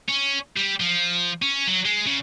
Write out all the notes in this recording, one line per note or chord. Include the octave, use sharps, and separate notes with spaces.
C#4
G3
F3
C#4
F#3
G#3
C#3